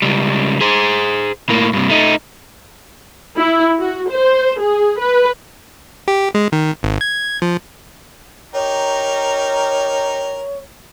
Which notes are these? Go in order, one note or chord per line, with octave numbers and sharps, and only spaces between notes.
C#2 G3
G#4 C5
A2 A#3
G2 C3
A3 D#4
E4
F#4
C5
G#4
B4
G4
G#3
D#3
G#1
G#6
F3
D#4 G4 A#4 C#5